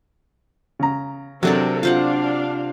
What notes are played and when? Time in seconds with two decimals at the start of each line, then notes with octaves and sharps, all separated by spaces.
0.79 C#3 A#5
1.43 C3 F#3 C4 D4 A4 A#4 D5
1.83 D4 F4 C5 F5 F#5